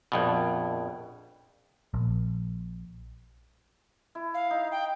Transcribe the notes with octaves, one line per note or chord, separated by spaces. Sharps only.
A#1 F2 B2
A#1
E4
F5
D#4
G5